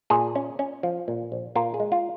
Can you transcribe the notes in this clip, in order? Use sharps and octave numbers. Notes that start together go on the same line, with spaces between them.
A#2 G#4
C#4
C#4
F3
A#2
A#1
A#2 F4 A#4
G#4
G#3
F4